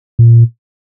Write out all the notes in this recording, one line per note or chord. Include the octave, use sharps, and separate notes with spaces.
A#2